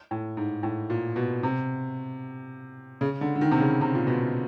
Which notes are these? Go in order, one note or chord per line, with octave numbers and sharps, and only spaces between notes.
A2
G#2
A2
A#2
B2
C3
C#3
D3
D3
D#3
C3
C#3
C3
A#2
B2